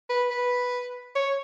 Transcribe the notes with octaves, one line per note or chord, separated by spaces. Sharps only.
B4
B4
C#5